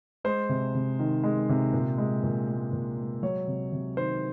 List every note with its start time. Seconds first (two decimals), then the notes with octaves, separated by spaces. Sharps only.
0.24 G#3 C5
0.49 C3
0.75 C3
0.99 D#3
1.23 G#3
1.49 C3
1.73 A#2
1.98 G#3
2.24 A#2
2.48 G#3
2.73 A#2
2.98 G#3
3.23 F#3 C#5
3.47 C3
3.72 C3
3.97 D#3 C5